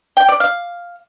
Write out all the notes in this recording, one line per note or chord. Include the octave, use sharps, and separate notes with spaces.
G5
D5
F5